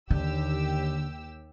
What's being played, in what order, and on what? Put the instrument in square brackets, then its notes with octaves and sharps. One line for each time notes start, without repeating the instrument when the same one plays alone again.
[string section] D#2 G4 E6 [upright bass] D3